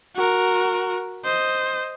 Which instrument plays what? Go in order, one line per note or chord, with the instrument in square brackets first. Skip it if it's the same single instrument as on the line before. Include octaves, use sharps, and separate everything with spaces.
[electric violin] F#4 A#4
C5 D#5